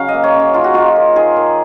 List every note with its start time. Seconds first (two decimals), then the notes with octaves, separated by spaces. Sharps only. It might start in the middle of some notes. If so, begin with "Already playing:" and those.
Already playing: C#3 F#3 F5
0.08 D#5
0.14 A#3
0.24 C#5
0.34 C#3
0.40 C#5
0.54 D#4 F4
0.64 F#4
0.74 D#4 F4
0.96 A#3
1.16 D#3 G#4
1.36 D#3